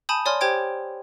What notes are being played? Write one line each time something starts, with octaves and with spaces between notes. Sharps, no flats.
G#5 A5 B5 D#6 G6
C#5 D5 G#5 C6 F6
G4 C5 G5 G#6 D7